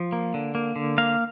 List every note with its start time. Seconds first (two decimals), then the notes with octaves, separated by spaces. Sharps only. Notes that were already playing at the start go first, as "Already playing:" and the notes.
Already playing: F3
0.13 A#3
0.34 D3
0.55 A#3
0.76 D3
0.98 A#3 F5